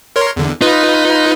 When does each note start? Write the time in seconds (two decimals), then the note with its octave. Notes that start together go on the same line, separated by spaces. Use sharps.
0.16 A#4 C#5 C6
0.36 E2 D3
0.61 D#4 F4 B4